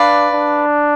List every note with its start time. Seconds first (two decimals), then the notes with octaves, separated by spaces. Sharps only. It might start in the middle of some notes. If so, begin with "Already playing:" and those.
Already playing: D4 B4 D5 F5
0.34 D4